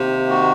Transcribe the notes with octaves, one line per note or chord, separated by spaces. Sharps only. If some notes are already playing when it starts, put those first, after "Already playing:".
Already playing: C3 D#3 A#3
F#4